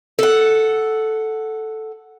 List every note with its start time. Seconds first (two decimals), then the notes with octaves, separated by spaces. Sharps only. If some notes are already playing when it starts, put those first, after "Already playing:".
0.19 A4 F#5